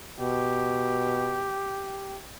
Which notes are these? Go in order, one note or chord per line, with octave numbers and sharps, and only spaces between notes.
B2 G4